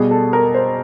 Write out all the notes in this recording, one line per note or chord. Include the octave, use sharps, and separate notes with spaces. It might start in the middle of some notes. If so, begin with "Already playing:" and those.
Already playing: B2 G3 G#4
A4
A#4
C5